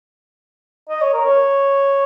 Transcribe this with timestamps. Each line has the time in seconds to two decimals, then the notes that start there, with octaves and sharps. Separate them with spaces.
0.89 D#5
1.02 C#5
1.13 A#4
1.26 C#5